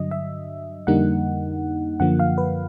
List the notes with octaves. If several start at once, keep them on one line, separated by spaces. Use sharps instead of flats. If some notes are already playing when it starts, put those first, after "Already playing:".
Already playing: G2 D3 F#3 D#5
E5
F2 D3 G3 A#3 D#4 F#5
F#2 D3 F3 A#3 F#5
F5
B4